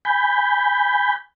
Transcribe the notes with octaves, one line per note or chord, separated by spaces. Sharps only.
G#5 B5 G6